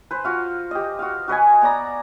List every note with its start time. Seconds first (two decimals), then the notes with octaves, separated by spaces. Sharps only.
0.11 B4 C5
0.25 F4 F#4 F5
0.71 G4 D#5
0.99 F#4 F5
1.28 F#4 B4 D#5 G#5
1.62 B3 D5 A#5